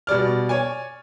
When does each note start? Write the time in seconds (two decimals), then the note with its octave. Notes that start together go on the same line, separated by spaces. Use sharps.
0.07 B2 G3 D5 F6
0.49 C#5 D5 G#5